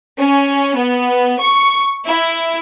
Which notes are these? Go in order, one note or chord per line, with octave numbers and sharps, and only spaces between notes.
C#4
B3
C#6
E4